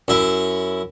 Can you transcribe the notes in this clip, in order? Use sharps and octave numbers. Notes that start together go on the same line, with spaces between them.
F#2 E4